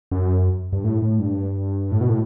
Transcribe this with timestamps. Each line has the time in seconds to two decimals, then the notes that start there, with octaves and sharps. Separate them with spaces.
0.11 F#2
0.73 G2
0.84 A2
1.02 A2
1.19 G2
1.91 A2
2.01 B2
2.10 A2